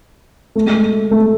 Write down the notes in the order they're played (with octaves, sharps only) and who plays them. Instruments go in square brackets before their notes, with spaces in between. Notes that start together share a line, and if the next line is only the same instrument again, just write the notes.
[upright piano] A3
G#3
A3
A3